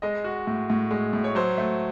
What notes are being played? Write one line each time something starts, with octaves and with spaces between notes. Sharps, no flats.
G#3 D#5
F#4
A2
A2
G#3
A2
C#5
F#3 C5
A3